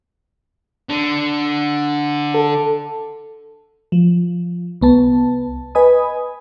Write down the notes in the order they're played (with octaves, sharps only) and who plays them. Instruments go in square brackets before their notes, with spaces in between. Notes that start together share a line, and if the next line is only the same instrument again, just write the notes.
[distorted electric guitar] D3
[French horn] A4
[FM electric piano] F3
C2 B3 A5
B4 D#5 G#5 B5 D#6